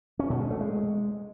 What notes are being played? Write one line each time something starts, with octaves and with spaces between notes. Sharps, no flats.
C#4
B2
G#3
A3
G#3